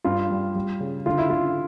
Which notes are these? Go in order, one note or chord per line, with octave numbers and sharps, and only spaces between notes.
G2 F4
G3
G3
C#3
D3 F4
E4
D3 F4